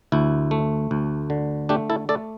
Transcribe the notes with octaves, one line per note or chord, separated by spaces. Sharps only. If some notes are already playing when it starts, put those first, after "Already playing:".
D2 E4
A3
D2
D3
A3 D4 G4
E4 A4
A3 A4 D5